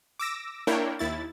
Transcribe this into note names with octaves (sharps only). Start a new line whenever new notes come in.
D6 E6 A#6
A#3 D4 E4 A#4 C#5 G5
D#2 E4 A6